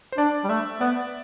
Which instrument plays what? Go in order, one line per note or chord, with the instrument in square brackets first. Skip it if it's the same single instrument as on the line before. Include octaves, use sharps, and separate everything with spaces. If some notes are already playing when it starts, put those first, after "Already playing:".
[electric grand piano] C5
[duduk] D4 [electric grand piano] D5
[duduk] G3
[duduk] A3 [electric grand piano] E5
[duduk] B3 [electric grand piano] D5